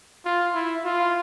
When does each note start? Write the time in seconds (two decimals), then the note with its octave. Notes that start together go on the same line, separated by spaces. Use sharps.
0.25 F4
0.54 E4
0.85 F4